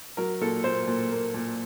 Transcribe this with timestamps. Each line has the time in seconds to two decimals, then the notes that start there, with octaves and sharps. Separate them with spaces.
0.17 F#3 A#4
0.41 A#2 A4
0.64 A#2 C5
0.88 A#2
1.11 A#3
1.34 A#2